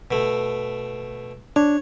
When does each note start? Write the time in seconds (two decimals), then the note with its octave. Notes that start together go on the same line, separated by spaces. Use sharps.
0.11 B2 A3
1.56 D4 C#5